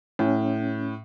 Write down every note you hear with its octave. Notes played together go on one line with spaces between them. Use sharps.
A2 C#4